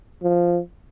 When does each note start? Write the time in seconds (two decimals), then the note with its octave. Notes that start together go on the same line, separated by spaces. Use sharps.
0.23 F3